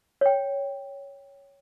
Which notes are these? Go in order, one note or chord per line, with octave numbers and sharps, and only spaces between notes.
C#5 G5